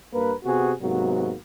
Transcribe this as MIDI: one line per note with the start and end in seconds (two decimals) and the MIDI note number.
0.13 0.33 43
0.13 0.33 58
0.13 0.33 70
0.13 0.33 71
0.45 0.73 48
0.45 0.73 59
0.45 0.73 66
0.45 0.73 68
0.81 1.34 44
0.81 1.34 48
0.81 1.34 54
0.81 1.34 58
0.81 1.34 59
0.81 1.34 66